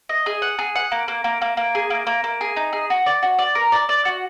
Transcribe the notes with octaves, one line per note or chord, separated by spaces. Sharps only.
D#5
G#4
F#5
G#4
F#5
A#3
A#3
A#3
A#3
A#3
G#4
A#3
A#3
A#3
G#4
D#4
G#4
F#4
D5
F#4
D5
A#4
D5
D5
F#4